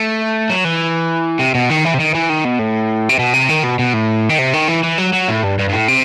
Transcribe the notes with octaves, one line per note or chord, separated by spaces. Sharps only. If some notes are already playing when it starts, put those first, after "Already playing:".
Already playing: A3
F#3
E3
C3
B2
D#3
E3
C3
D#3
E3
D#3
B2
A2
C3
B2
C3
D#3
B2
B2
A2
D#3
C3
D#3
E3
E3
F#3
F#3
A2
G2
G2
G2
A2
C3